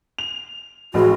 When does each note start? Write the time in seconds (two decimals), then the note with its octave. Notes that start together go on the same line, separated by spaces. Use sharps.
0.18 F7
0.94 A1 G#3 F#4 B4